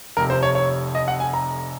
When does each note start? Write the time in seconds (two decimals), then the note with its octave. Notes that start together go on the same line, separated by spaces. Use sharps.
0.17 F1 F2 C3 A#4
0.30 C5
0.43 C#5
0.55 C#5
0.95 D#5
1.08 F#5
1.20 G#5
1.34 A#5